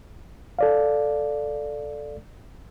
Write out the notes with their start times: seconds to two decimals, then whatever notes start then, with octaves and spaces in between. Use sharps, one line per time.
0.59 A4 D5 F5